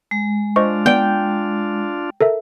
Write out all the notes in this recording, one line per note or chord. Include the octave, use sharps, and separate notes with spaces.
G#3
D4 F4 C5 D#5 C#6
B3 D5 G5 D7
A4 A#4 E5